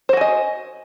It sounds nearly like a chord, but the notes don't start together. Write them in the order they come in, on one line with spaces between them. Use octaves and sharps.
C5 F#4 G#5 D#5